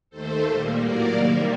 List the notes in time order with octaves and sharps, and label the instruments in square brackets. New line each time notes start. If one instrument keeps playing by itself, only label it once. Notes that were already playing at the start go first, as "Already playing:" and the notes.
[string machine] D#2 D#3 A3 A4 C5
A#2 G3 A#3
A2 F#3 A#3 A#4 D5
C3 D#3 G3 A#3